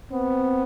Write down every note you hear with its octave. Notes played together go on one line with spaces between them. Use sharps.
B3 C4